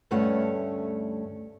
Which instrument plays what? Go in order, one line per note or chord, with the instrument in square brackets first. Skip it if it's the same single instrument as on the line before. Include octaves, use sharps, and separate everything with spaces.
[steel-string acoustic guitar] D2 G2 A3 C#4 C#5 F#5